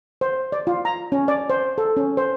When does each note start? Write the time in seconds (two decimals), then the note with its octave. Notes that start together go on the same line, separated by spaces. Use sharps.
0.21 C5
0.52 D5
0.67 F4
0.85 A#5
1.12 C#4
1.28 D5
1.50 C5
1.78 A4
1.97 C#4
2.17 C5